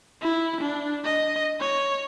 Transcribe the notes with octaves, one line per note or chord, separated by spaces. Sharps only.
E4
D4
D#5
C#5